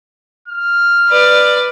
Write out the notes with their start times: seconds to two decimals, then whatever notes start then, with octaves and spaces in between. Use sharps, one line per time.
0.48 F6
1.09 B4 D5